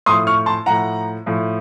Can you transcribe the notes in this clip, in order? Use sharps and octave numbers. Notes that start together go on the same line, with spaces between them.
A2 F3 C6 D#6
C#6 F6
A5 C6
A2 F3 F#5 A#5
A2 F3